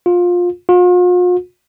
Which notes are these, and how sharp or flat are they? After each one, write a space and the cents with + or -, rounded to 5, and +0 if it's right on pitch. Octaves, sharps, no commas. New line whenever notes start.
F4 +20
F4 +45